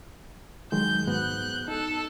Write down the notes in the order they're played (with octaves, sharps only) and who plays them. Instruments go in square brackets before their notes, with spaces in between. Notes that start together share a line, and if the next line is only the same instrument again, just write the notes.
[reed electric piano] D#3 F#3 G#3 [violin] G6
[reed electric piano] G#2 B3 F#4 [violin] F#6 G6
[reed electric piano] D#4 [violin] A4